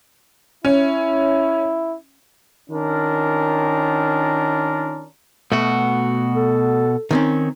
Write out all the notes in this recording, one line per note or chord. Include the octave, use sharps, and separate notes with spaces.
C#4 E4
D#3 C#4 D4 F4 A#4
B2 A3 F#4
A4
D#3 C4 C#4